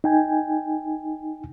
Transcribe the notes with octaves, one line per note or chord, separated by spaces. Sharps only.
D#4 G5 G#5